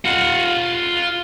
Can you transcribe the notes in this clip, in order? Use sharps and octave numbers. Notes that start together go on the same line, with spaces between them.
F4 F#5